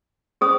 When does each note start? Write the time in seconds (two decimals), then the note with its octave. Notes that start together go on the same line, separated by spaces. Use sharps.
0.41 C#4 G#4 C5 D#6